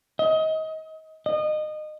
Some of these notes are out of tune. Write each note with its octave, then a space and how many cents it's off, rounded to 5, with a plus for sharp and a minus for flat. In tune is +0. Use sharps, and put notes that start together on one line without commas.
D#5 +30
D#5 -25